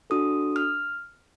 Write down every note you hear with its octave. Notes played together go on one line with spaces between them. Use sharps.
D4 F#4 A4 D#6
F6